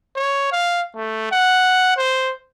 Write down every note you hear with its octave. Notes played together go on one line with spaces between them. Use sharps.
C#5
F5
A3
F#5
C5